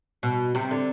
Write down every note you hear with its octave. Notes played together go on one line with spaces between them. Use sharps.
B2
C3
D3